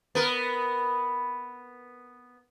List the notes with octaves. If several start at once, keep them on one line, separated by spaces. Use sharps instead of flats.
B3 A#4